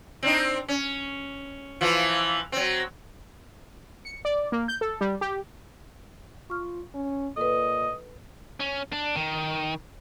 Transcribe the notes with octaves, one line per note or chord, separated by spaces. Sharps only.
C4 D4 D#4
C#4
E3 F3 F4
F#3 C4
C#7
D5
A#3
G6
A4
G3
G4
F4 C#6 F6
C#4
A#2 A4 B4 D#5
C#4
D4
D#3